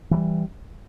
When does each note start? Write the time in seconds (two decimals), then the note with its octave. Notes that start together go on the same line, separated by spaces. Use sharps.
0.11 E3
0.14 F#3
0.16 G3